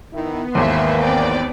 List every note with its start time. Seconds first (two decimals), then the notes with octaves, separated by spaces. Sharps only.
0.12 D#3 B3 D#4 E4
0.55 G#1 D#2 E3 A#3 E5 C6
1.00 C4 D5 G5